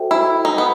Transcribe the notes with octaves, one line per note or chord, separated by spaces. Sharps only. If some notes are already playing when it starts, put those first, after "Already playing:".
Already playing: F#4 A4 C5 E5 G5
E4
D#4
B3